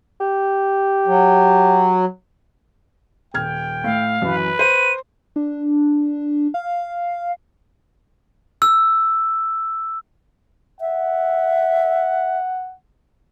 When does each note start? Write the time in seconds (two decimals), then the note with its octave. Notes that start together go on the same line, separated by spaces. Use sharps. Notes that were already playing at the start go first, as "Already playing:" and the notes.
0.20 G4
1.07 F#3
3.34 D#1 G5 F6 G#6
3.84 A2 F5
4.22 F#2 E3 B4
4.59 C5 D#7
5.36 D4
6.54 F5
8.62 E6
10.81 E5 F#5